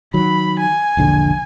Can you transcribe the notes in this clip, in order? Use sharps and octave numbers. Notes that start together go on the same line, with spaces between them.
D#3 F#3 B5
G#5
E1 A#1 D3